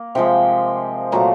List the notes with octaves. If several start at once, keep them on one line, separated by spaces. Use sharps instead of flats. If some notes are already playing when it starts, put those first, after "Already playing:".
Already playing: A#3
C3 F3 G#3 G5
A#2 F#3 A3 A#5